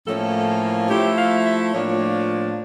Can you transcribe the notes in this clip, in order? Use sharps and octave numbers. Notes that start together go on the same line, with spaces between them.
A2 F3 A#3 C#4 E4 A4
F3 A3 E4 G4
F5
E5
A2 F3 A#3 D4 F4 C#5